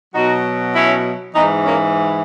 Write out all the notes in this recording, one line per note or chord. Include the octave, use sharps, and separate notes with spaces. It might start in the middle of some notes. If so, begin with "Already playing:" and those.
B2 F#3 D#4 F#4
C#4 E4
G#2 E3 B3 D#4
A#3 C#4